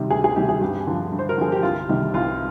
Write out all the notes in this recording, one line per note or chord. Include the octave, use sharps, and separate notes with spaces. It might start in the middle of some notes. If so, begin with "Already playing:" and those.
Already playing: C3 D#3 G3
D2 G#4
G#4
C3 D#3 G3 G4
G#4
G2 G4
D3 F3
G2
C5
A#4
D3 F3 G#4
G4
C2 F4
C3 D#3 G3
C2 F4